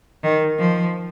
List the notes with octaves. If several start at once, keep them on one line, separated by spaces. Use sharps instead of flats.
D#3
F3